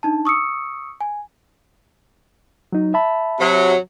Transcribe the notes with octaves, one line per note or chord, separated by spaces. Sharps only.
D4 D#4 A5
C#6 D#6 E6 C#7
G#5
F#3 D#4
E5 A5 B5
C3 F#3